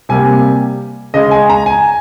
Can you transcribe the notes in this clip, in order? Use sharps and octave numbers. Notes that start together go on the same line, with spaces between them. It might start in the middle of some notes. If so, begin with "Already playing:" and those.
C3 G3 A#3 G#5
C#3 G#3 D#5
G#5
A#5
G#5